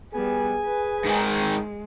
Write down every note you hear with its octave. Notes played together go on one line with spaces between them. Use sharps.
G3 B3 G#4 G#5
B4
G#2 D#3 G#3